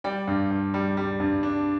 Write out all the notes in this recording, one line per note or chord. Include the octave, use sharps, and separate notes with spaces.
G3 D5 G5
G2
G2
G3
G3
G2
D4